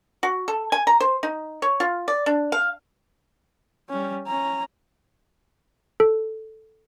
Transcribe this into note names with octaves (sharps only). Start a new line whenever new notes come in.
F#4
A4
G#5
A#5
C5
D#4
C#5
F4
D5
D4
F5
G3 C#4
C#4 A#5
A4